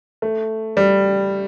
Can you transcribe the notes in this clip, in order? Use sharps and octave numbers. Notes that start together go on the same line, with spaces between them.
A3
G3